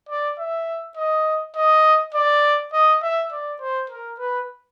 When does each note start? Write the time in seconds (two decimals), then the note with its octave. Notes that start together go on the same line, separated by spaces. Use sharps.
0.09 D5
0.38 E5
0.97 D#5
1.56 D#5
2.14 D5
2.73 D#5
3.02 E5
3.32 D5
3.60 C5
3.90 A#4
4.19 B4